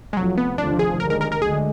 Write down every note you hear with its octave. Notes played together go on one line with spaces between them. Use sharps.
G#3
F1 F2 F3 F#3
B3
F1 D#2 D3 F3 D4
G#4
D#2 D3 G#3 A#4
A#4
A#4
A#4
D2 D3 G#3 G#4